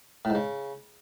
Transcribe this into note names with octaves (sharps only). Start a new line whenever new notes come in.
A2
G#2
C#3